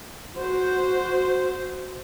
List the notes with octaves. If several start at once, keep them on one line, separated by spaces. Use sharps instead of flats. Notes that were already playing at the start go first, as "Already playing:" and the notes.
F#4 C5